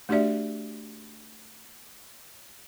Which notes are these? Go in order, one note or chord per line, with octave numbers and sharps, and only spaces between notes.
A3 D4 F#4 G4 D5 E5